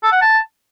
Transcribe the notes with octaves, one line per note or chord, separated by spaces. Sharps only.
A4
F#5
A5